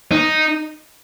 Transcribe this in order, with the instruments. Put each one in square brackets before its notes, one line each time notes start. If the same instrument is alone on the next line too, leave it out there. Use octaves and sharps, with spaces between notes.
[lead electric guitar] D#4